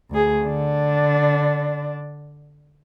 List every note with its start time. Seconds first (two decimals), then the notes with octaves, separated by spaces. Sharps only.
0.10 D2 G#4
0.44 D3 D4